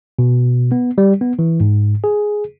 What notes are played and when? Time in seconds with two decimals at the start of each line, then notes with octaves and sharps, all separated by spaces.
0.19 B2
0.72 B3
0.98 G3
1.21 B3
1.39 E3
1.60 G#2
2.04 G#4